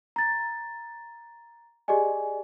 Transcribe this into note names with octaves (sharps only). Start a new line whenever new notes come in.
A#5 A6
G4 G#4 D5 D#5 G#5